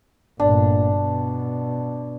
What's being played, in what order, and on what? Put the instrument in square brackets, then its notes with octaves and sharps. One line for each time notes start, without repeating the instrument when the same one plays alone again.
[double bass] G1 A#2 [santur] D4
[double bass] B2